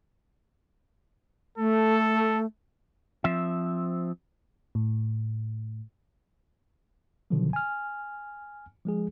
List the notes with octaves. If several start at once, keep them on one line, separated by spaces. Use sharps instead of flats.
A3 A4
F3 C4 E5
A2
B2 D3 D#3 F3 F#3
G#5 F6
F3 G#3 G#4